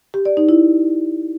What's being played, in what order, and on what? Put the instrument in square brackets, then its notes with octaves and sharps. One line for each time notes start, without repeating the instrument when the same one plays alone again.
[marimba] G4
D5
D#4
E4